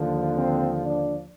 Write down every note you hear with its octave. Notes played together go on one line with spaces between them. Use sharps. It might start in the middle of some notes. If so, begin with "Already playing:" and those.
Already playing: D#2 D3 F3
C4
D4